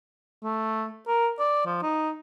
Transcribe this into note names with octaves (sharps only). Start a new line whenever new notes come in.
A3
A#4
D5
F3
D#4